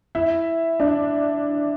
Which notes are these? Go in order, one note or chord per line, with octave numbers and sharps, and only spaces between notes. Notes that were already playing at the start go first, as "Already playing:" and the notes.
E4
D4